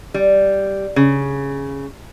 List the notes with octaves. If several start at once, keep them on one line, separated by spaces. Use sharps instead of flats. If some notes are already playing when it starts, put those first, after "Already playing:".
G3
C#3